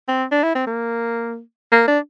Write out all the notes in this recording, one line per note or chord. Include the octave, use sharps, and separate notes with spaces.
C4
D4
E4
C4
A#3
A#3
D4